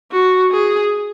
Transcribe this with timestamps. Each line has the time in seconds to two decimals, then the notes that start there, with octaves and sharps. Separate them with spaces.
0.12 F#4
0.52 G#4